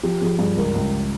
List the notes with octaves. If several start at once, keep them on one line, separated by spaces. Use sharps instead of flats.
F3 G4
F3 G#4
G2 G#4
C#2 A#4
C#2